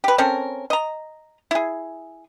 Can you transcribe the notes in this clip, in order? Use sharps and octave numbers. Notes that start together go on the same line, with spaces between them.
G4 B4
C4 C#4 A4 A#4
D#5 A#5
E4 G#4